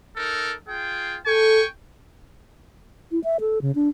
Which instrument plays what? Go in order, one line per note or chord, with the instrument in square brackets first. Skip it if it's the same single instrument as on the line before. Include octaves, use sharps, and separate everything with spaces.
[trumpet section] D#4 A4 A#4
F4 G#4 G5
[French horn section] A4 [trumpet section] G5 G#5 C#6
[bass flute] E4
E5
A4
C#3
D4